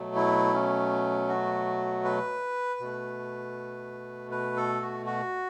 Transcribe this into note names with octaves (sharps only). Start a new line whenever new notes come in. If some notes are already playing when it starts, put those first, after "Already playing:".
Already playing: B2 F#3 A3
E4
C#4
F#4
B4
B2 A3
B4
A4
F#4
F#4